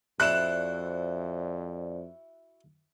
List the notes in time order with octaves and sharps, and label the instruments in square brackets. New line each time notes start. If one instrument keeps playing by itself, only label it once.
[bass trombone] F2 [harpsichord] E4 F#4 A4 [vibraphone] C5 D5 [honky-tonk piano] F#6 E7